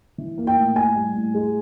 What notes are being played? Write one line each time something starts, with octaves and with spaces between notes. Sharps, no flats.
E3
A#3
G5
A2
A2 G#5
G3
A2
G#3